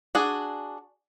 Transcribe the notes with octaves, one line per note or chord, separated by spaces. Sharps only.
D4 F#4 G#4